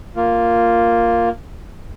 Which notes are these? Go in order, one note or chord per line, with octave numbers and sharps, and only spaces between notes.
A#3 F4